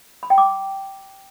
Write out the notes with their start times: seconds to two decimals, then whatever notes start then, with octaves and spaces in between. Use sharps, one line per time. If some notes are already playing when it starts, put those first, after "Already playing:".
0.23 B5
0.30 G5
0.38 D6